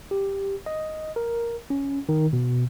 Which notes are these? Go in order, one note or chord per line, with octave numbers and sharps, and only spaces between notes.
G4
D#5
A#4
C#4
D#3
B2